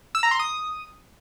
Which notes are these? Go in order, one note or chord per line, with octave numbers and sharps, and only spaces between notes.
E6
A#5
C6
D#6